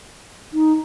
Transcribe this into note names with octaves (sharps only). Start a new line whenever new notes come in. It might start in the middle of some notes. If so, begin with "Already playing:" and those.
D#4